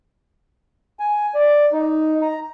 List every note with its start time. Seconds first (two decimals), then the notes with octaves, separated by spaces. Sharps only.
0.99 G#5
1.35 D5
1.73 D#4
2.22 A#5